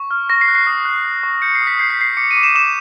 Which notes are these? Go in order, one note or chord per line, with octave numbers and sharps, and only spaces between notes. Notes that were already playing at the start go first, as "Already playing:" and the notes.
Already playing: C#6
F6
C#6 A#6
C7
F#6
C7
D#6
F#6
F#6
C#6
G6 C#7
C7
D#6
B6
G6 C7
B6
G6 C7
D6 C#7
D#7
D6
E7
D6 E7